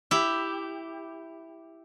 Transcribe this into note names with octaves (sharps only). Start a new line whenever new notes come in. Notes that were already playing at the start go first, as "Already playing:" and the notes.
E4 G4